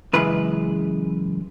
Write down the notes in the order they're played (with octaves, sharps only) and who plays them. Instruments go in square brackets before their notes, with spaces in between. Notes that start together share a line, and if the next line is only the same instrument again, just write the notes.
[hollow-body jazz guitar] F#2 C#3 E3 G#3 B4